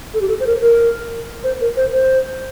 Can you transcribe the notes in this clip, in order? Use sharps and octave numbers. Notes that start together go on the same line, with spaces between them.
A4
G4
A4
C5
A#4
A#4
C5
A#4
C5
C5